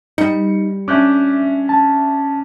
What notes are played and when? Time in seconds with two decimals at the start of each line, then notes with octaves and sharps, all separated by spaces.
0.18 G3 D#4 C#7
0.88 C#4 D4 E5 D6 F#6 G6
1.69 A5